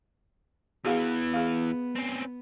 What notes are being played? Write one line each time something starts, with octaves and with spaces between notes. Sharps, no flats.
E2 E3 B3 F#4 G#4 F5
G#4 F5
C4 C#4